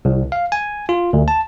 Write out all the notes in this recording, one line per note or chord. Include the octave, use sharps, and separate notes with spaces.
C2
F5
G#5
F4
D2
A5